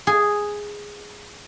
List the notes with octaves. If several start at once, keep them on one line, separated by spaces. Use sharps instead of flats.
G#4